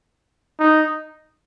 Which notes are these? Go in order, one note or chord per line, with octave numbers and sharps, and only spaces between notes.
D#4